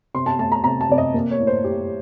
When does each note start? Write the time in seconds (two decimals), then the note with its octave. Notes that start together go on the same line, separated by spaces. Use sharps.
0.14 C3 C6
0.26 A5
0.39 A3 A5
0.52 A#5
0.64 C3 A#5
0.81 A5
0.89 C3 D5
0.98 D#5
1.14 A#3
1.31 C#5
1.39 A2
1.47 C5
1.64 A2 G4